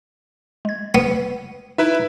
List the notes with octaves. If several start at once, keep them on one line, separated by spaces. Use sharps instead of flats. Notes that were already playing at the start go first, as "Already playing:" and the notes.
G#3 G#6
B3
D#4 E4 B4 E5